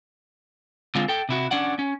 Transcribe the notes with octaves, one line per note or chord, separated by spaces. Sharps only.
D3 G#3 C4 F4
A4 G5
C3 E4 F#4
C#4 D4 D5 F#5
C#4